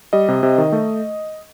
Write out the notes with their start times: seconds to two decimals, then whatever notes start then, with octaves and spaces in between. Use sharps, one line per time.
0.13 G3 D#5
0.28 C3
0.43 C3
0.58 D#3
0.72 A3